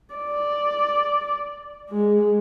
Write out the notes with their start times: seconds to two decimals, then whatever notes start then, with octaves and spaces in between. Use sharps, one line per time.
0.15 D5
1.90 G#3